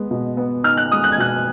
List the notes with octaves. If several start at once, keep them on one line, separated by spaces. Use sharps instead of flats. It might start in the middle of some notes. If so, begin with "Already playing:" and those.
Already playing: G#3 B3
B2
B3
D#4 F6
F#6
G#3 D#6
F#6
G#6
B2 F#6